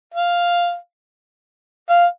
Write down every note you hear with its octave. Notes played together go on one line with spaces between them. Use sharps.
F5
F5